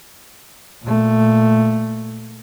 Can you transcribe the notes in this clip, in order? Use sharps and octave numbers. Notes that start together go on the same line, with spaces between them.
A#2 A3